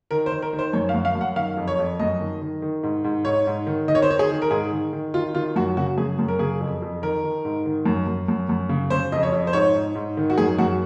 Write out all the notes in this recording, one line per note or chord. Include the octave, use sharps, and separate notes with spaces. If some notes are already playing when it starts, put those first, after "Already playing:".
D#3 A#4
C5
D#3
A#4
D#3
C5
F#2 C#5
F5
F#2
F5
F#2
F#5
D#3 F5
F2
C#5
F2
F#2 D#5
D#3
D#3
D#3
G#2
G#2
G#2 C#5
G#2
D#3
D#3 D#5
C#5
C5
D#3 C#5
G#4
D#3
A#4
G#2 G#4
D#3
D#3
D#3 F4
D#3 F4
F#2 F#4
C#3 F#4
F#2 G#4
F#2
A#4
C#3 G#4
F2
F2
D#3 A#4
D#3
G#2
D#3
F#2
F#2
F#2
F#2
C#3
C#3 C5
F2 D#5
C#5
F2
C5
G#2 C#5
G#2
G#2
D#3
F#4
F#2 G#4
F#2 F#4